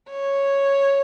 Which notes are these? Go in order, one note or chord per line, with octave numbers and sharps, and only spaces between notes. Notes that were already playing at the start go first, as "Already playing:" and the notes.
C#5